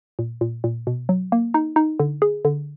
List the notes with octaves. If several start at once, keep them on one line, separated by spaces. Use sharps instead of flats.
A#2
A#2
A#2
B2
F#3
A#3
D#4
D#4
D3
G#4
D3